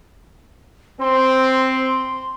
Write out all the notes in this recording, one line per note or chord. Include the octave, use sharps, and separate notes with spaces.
C4 C6